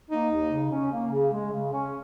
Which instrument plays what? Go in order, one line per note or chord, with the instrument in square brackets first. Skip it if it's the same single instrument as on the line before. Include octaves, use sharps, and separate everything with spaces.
[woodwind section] A#3 [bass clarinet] D#4
[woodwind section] D#2
C#3
C#4
A#3
C#3
G#3
C#3
C#4